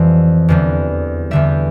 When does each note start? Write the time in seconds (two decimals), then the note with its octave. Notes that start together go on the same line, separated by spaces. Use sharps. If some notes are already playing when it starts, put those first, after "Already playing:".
Already playing: F2 E3 G3
0.48 E2 D3 G3
1.31 E2 D3 G3 E5